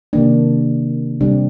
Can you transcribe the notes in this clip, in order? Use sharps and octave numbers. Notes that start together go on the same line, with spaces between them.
C3 D#3 A#3 D4
C3 G3 C4 D4